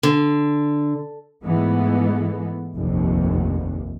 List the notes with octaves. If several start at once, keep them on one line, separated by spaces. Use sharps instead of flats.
D3
G#2 E3 G#3 A3 B3
F1 A#1 D#2 C3